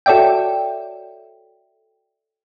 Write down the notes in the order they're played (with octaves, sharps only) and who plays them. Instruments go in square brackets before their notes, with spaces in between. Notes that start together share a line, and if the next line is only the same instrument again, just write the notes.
[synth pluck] F#4 A4 C#5 D5 E5 G5